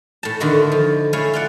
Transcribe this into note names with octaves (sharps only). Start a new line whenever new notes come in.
A2 A5
A2 D3 D#3 E4 F#4
F3
A3 E4 C#5 F5 G#5
F4 D5 F#5